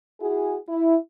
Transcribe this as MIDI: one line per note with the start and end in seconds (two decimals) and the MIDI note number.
0.21 0.57 64
0.21 0.57 66
0.21 0.57 68
0.68 0.96 64